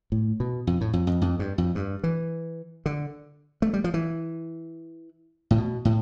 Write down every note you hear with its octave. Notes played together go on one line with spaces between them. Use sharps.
A2
B2
F2
A2
F2
F2
F2
G2
F2
G2
E3
D3
A3
G3
F3
E3
A2
B2
A2